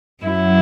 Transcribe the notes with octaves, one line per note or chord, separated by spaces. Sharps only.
F#2 F#3 E4